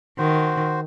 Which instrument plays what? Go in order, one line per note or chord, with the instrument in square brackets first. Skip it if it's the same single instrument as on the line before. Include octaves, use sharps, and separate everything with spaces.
[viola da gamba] D#3 [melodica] F#4 C5